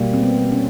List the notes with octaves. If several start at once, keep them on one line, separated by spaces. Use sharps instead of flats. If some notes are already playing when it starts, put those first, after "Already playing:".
Already playing: B2 G3 A#3
C4
B3
C#4